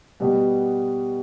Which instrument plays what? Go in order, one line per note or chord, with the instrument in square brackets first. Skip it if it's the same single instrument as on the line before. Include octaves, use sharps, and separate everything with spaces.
[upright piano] B2 G3 B3